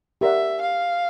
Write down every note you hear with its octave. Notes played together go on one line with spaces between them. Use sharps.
G4 A#4 D5 E5 F#5
F5